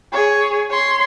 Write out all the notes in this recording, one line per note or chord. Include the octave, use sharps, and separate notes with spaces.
G#4 C#5
C#5 C6